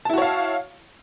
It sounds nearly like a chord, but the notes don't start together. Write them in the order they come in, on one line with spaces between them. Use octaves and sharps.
A5 E4 F#4 C#5 F5